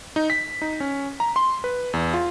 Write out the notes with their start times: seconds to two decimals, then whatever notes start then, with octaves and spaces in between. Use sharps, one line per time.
0.16 D#4
0.30 B6
0.62 D#4
0.80 C#4
1.20 A#5
1.36 C6
1.64 B4
1.93 E2
2.14 F4